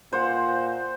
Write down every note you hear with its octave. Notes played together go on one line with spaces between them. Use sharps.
A#2 C5 F#5